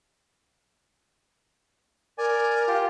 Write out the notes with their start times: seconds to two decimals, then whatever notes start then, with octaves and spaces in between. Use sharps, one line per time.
2.18 A#4 D5 G#5
2.68 F4 G4